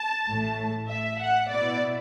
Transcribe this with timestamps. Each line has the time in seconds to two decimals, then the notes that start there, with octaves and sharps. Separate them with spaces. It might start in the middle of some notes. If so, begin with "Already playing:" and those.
Already playing: A5
0.29 A1 A2 A3
0.89 E5
1.20 F#5
1.50 B2 B3 E4 D5